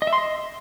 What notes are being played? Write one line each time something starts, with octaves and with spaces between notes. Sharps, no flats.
D#5
E5
C6
D#5